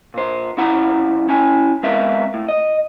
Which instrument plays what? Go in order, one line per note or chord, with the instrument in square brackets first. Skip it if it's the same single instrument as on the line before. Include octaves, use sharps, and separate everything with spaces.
[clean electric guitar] A#2 C5
C2 C#3 E4 F#5 A#5
C#4 E4 G#5
G#3 B3 C4 A#4 E5 F5
A2
D#5